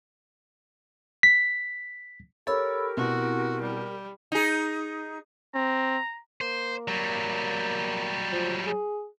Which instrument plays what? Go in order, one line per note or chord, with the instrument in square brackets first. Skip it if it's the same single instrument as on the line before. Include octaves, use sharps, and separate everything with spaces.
[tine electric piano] B6
[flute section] G4 A#4 [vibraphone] A4 B5 E6 [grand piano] C#5
[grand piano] B2 [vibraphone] C4 E4 F#5 [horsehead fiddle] F#4
[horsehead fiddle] G3
[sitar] D#4 G#4
[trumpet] C4 [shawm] A#5
[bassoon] A#3 [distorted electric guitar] C5
[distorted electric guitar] F#3 G3
[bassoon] F3
G#4